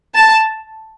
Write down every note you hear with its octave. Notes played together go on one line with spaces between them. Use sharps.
A5